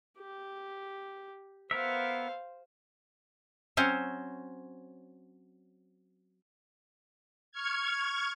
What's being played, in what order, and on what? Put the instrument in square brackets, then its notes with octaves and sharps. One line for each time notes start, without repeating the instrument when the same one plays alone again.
[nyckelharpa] G4
[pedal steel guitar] B3 A#4 E5 [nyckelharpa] C5 F5
[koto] F#3 C4 C#4 C5
[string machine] C#6 F6 G#6